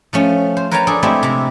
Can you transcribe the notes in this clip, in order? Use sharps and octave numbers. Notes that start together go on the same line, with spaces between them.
F3 A3 C#4
C5
A#4 B4 C#5 G5 A5 A#5
D4 G#4 A4 D5
G#3 A3 C4 E4 G4
C3 E4